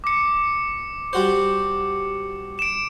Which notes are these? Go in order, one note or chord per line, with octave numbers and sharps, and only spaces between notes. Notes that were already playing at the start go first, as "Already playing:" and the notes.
D6 C#7
G3 F#4 C5
D7 E7